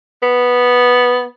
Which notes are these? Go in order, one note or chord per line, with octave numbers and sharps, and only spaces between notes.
B3